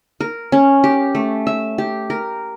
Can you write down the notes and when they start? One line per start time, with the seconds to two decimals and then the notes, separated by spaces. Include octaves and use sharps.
0.21 A#4
0.52 C#4
0.84 G4
1.15 A3
1.47 E5
1.78 G4
2.10 A#4